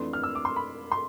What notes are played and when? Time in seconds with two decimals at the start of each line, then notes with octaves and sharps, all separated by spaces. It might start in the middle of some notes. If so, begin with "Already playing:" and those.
Already playing: F2 E3 A3 D4 C6
0.13 F6
0.23 E6
0.35 D6
0.45 C6
0.56 B5
0.92 C6